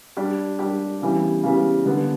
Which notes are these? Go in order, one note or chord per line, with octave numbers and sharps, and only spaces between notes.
G3 D4 G4
G3 D4 G4
C#3 E3 G3 B3
C#3 E3 G3 B3
D3 G3 B3